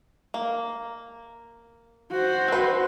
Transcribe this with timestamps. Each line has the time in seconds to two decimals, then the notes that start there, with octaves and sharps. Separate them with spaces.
0.34 A#3
2.11 F#4 C5
2.48 C4 B4